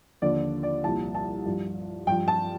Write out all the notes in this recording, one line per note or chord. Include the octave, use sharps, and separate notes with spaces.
D#2 D3 F3 D5
D5
C2 A#2 F3 A5
A5
G2 F3
G2 F3 G5
A5